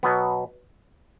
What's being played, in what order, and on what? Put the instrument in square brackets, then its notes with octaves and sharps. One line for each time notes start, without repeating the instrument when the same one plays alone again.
[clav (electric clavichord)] B2 F#3 B3